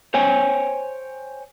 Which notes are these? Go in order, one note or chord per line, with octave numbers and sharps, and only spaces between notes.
C5 C#5 G5 G#5